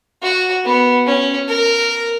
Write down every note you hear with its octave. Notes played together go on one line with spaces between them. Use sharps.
F#4
B3
C#4
A#4